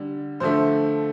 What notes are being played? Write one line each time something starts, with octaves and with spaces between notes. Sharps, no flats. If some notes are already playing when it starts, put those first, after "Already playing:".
Already playing: D3 G3
D3 F3 A3 C5 C6